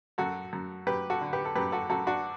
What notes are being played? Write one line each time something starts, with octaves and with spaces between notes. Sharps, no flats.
F#2 F#4 A4
F#2
F#2 G4 B4
F#4 A4
D3
G4 B4
A4
F#2 G4 B4
F#4 A4
F#2 F#4 A4
D4 F#4